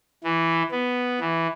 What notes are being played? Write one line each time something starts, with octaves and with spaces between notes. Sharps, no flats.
E3
B3
E3